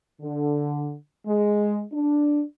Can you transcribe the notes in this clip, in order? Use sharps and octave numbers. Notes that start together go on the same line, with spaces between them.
D3
G#3
D4